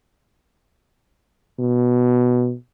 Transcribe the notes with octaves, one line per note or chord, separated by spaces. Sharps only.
B2